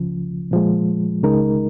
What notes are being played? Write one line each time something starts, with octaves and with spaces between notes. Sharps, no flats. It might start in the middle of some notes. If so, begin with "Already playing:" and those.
Already playing: C#2 C#3 F3
A#2 F3 G#3
C#2 C#3 G#3 D#4 A#4